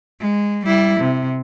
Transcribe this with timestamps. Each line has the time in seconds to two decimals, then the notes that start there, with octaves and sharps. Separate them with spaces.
0.20 G#3
0.66 G3 E4
1.00 C3